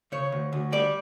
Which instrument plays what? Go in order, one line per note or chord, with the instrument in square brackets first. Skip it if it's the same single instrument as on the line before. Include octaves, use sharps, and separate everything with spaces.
[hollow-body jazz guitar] C#3 C#5
D2
D2
G3 D5